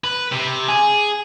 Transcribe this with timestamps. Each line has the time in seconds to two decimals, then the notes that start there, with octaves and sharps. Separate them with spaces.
0.04 B4
0.32 C3
0.68 G#4